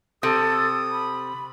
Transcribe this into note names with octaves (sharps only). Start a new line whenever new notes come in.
C3 A4 D#6
B5